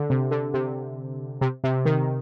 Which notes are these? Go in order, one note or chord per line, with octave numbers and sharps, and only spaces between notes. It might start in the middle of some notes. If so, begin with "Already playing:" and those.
Already playing: D3
C3
D3
C3
C3
C3
D#3